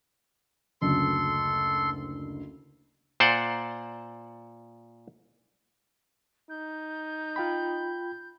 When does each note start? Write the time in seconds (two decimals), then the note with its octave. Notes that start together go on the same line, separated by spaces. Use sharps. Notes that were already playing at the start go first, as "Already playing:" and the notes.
0.82 F#1 D2 A4 C6
3.20 A#2 C5 D5 F#5
6.50 D#4 G6
7.36 F4 G5 B5